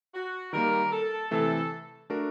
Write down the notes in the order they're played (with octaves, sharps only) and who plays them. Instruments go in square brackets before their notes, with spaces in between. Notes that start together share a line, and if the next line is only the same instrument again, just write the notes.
[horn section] F#4
[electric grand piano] D#3 G3 A#3 [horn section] A#4
[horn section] A4
[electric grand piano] C3 E3 A3 [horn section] A4
[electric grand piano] A3 D4 F#4 A#4